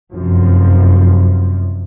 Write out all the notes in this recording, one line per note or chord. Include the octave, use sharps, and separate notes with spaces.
F1 F#2 F3